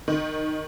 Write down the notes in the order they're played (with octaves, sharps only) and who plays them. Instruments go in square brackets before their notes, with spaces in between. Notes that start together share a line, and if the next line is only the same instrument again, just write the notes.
[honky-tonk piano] D#3